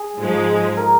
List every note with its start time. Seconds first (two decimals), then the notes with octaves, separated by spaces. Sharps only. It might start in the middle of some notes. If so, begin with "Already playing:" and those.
Already playing: G#4
0.21 G#2 F3 G#3
0.77 A#4